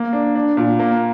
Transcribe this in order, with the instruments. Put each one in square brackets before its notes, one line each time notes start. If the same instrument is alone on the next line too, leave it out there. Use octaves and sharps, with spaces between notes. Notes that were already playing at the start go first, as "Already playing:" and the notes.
Already playing: [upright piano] A#3
D4
D4
A#2
A#3